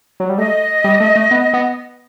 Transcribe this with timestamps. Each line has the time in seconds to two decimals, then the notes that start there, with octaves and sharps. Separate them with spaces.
0.20 F#3
0.29 G3
0.38 A3 D#5
0.84 G3
1.00 A3
1.16 A3
1.31 B3
1.53 B3